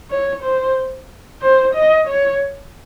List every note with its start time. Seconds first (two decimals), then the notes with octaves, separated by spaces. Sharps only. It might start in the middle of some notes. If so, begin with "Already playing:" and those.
0.11 C#5
0.43 C5
1.42 C5
1.75 D#5
2.08 C#5